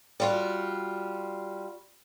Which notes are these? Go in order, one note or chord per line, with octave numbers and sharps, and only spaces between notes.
G3 F4 F#4